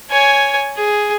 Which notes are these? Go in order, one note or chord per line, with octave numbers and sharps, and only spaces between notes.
C#5 G#5
G#4